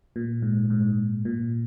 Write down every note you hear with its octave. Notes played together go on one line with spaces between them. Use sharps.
A#2
G#2
G#2
A#2